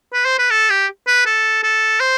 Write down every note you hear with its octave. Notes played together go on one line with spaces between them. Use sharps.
B4
C5
B4
A4
G4
B4
A4
A4
C5